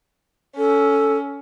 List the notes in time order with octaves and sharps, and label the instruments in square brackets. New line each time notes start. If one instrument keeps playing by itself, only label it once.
[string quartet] C#4 [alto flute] A4